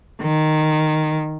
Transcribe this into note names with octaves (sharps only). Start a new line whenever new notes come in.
D#3